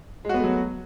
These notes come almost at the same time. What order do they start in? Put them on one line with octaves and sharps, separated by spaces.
G#3 F#4 B3 A3 F#3